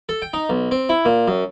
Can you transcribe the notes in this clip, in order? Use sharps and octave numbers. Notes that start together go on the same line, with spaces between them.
A4
G5
D#4
B1
C4
E4
A#2
F#2